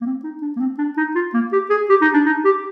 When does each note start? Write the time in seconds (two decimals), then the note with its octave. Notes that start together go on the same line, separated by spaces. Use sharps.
0.01 A#3
0.06 C4
0.24 D#4
0.42 D4
0.56 A#3
0.60 C4
0.78 D4
0.97 D#4
1.15 F4
1.34 A#3
1.53 G4
1.70 G#4
1.90 G4
2.02 D#4
2.14 D4
2.26 D#4
2.45 G4